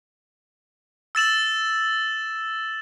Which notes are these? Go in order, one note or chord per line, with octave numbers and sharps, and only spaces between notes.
E6 A6 E7 F#7